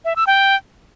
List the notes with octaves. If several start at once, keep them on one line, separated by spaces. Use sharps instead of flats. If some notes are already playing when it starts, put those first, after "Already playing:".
E5
E6
G5